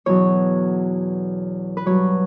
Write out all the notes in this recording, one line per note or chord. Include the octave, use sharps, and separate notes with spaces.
E2 B2 F#3 C#5
B4
G2 F#3 C#5